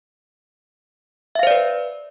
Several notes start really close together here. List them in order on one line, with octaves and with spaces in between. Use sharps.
E5 F5 C5 D5 B4